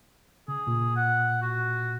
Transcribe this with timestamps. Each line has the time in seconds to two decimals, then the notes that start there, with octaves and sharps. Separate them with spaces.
0.48 C#3 G#4
0.67 A#2
0.96 F#5
1.42 F#4